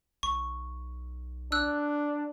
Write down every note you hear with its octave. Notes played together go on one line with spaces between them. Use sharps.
B1 C#6
D4 E6 F#6